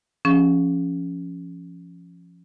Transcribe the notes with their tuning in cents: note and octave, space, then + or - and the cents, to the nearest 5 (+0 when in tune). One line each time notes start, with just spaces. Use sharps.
F3 -15 C#4 +0 G#4 +0